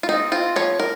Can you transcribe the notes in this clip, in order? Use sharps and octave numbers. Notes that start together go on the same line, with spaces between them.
F4
C4 D#4
C4 F4
F3 C#5
A#4